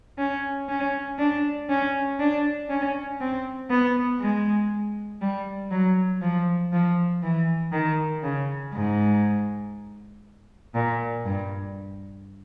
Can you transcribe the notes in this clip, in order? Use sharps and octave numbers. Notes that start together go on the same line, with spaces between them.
C#4
C#4
D4
C#4
D4
C#4
C4
B3
G#3
G3
F#3
F3
F3
E3
D#3
C#3
G#2
A#2
G2